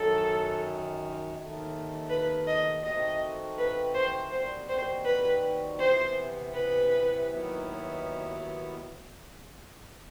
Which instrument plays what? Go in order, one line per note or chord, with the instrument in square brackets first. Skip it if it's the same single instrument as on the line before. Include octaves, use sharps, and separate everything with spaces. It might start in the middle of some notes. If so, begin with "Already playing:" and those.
Already playing: [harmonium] F#2 D#3 F#3 [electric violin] A4
[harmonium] D#2 D#3 A3
[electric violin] B4
D#5
[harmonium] D#3 A3 C4 F#4 [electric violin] D#5
[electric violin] B4
C5
[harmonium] D#2 D#3 G3 C4 F#4 [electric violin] C5
[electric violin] C5
B4
[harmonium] C3 E3 B3 [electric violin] C5
[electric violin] B4
[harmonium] D#2 D#3 F#3 B3 E4